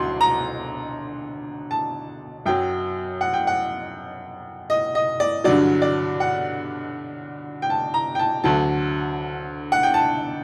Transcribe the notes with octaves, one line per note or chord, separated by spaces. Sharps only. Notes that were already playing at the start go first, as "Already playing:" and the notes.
Already playing: D2 D3 F#3 C6
A#5
A5
F#2 F#3 G5
F#5
G5
F#5
D#5
D#5
D5
G2 D3 F#3 D5
D5
F#5
G5
A5
A#5
G5
A5
D2 D3 F#3 A5
F#5
G5
A5